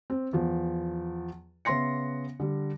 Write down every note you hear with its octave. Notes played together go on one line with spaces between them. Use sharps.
C4
E2 F3
C#3 B3 E5 C6 A#6 C#7
D3 G3